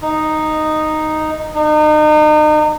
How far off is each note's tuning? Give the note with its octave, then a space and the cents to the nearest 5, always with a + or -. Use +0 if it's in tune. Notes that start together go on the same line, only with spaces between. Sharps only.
D#4 -5
D#4 -35